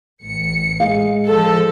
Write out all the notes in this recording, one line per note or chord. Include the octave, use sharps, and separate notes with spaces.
A1 C#7
G#3 G#4 F5
F3 A4